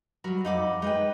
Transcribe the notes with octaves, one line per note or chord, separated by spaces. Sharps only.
F#3 G3 F#4 A#4 B5
F2 D#4 F#5 B5 D6
G#3 D#4 B4 G5